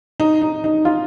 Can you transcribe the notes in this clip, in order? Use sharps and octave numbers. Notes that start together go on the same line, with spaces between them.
D#4
D#4
D#4
F4